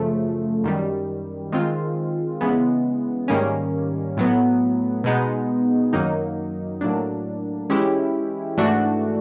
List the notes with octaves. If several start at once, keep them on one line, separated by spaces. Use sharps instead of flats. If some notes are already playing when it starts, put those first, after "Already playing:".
Already playing: F#2 C#3 F3 A3
F#2 D#3 G3
D#3 G#3 C4 F4
C#3 E3 G#3 B3
G#2 D#3 G3 A#3 C#4
A2 F#3 B3
B2 G#3 B3 D#4
F#2 D#3 F#3 A#3 D#4
A2 F#3 A#3 D4
E3 G#3 C#4 E4 G4
G#2 E3 A3 D4 F#4